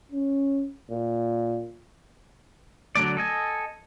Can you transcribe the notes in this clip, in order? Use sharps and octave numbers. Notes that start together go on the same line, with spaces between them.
C#4
A#2
D3 F#3 A3 D5
A4 D#5 G#5